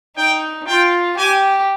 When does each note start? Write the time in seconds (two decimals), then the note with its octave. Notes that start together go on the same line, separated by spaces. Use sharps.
0.17 D#4 G5
0.67 F4 G5
1.17 G4 G#5